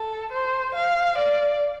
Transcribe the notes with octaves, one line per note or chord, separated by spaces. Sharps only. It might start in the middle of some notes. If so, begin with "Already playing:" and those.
Already playing: A4
C5
F5
D5